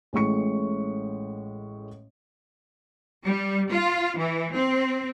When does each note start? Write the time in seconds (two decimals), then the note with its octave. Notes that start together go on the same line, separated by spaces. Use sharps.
0.13 A1 A2 G#3 C#6 C#7
3.25 G3
3.71 F4
4.18 E3
4.55 C4